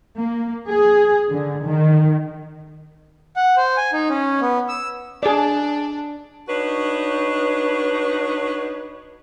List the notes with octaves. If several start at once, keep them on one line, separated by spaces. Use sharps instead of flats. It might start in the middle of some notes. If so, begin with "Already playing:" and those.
A#3
G#4
D3
D#3
F#5
C5
G#5
D#4
C#4
B3
E6
D4 G#4 D5
D4 D#4 F#4 B4 C#5